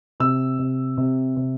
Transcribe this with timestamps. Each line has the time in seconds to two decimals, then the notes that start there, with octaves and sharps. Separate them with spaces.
0.20 C3 E6
0.59 C3
0.97 C3
1.36 C3